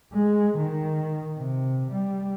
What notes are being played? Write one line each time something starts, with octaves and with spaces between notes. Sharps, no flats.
G#3
D#3
C3
G3